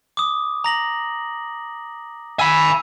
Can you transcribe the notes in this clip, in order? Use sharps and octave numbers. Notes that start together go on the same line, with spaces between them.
D6 D#6
A#5 A#6 F#7
G#5 B5 E6